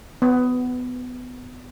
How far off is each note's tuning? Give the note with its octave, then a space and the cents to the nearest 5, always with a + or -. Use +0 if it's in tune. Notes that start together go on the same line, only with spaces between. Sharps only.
B3 +20